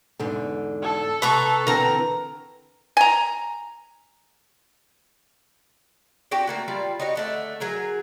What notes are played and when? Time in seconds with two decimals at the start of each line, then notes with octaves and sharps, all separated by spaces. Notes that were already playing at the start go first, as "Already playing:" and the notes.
0.19 E2 G#2 D3
0.82 A4
1.22 C3 A4 B4 A#5 C#6
1.67 D3 E3 C4 A#4 A#5
2.97 G#5 A#5
6.31 D4 F#4 G4 G5
6.47 A3 A#3 F#4
6.68 G3 F4 D5
7.00 D#4 F#4 G4 C#5
7.15 D3 A3 F#5
7.60 F#3 G#4 A#4